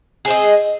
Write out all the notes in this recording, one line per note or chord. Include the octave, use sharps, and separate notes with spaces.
C4 G#4 D#5